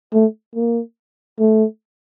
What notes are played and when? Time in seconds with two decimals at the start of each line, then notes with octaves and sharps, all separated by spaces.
0.13 A3
0.55 A#3
1.39 A3